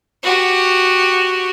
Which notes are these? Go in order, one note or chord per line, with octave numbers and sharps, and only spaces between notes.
F#4 G4